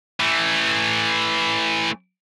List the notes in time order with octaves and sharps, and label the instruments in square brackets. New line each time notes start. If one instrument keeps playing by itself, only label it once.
[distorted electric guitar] E3 A3